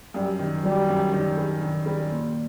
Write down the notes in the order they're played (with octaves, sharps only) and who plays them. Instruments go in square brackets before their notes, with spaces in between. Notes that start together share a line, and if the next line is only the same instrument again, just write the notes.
[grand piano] F#2 [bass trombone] G3
[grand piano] D#3
[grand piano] F#3 [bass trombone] G3
[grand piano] F#2
D#3
G3
D#3
G3
A#2